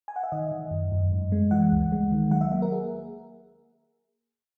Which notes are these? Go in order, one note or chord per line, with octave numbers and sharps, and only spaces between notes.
G#5
F#5
E5
D#3 D#5
D#3
F#2
F#2
G#2
G#3
E3 F#5
C#2
G#3
D#3
F#3 F#5
E5
A#3 E5
A#4
G#4